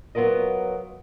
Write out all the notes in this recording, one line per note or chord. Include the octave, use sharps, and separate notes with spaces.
F#3 B3 F4 A#4 D#5